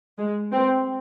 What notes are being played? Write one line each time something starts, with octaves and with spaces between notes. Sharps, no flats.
G#3
C4